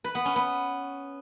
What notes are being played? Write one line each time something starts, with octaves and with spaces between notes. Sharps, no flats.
B4
B3
C#4
B3